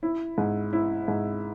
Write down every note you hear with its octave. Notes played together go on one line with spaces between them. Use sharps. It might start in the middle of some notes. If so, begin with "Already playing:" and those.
E4
G#2
E4
G#2